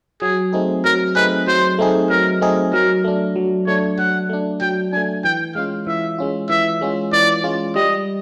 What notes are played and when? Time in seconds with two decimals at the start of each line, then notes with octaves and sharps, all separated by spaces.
0.21 F#3 G#4
0.53 A3 C4 D#4 G#4
0.85 F#3 A#4
1.15 A3 C4 D#4 G#4 B4
1.47 F#3 C5
1.79 A3 C4 D#4 G#4
2.10 F#3 A#4
2.41 A3 C4 D#4 G#4
2.73 F#3 A#4
3.04 A3 D4
3.36 F#3
3.67 A3 D4 C#5
3.98 F#3 F#5
4.29 A3 D4
4.61 F#3 G5
4.93 A3 D4 G#5
5.24 E3 G5
5.55 G#3 C#4 F4 F5
5.87 E3 E5
6.18 G#3 C#4 F4
6.50 E3 E5
6.81 G#3 C#4 F4
7.13 E3 D5
7.44 G#3 C#4 F4
7.75 G3 D#5